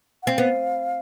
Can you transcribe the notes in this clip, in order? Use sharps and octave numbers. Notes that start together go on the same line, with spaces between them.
F#5
C4 F5
B3